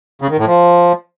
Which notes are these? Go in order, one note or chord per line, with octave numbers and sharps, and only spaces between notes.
C#3
D#3
A2
F3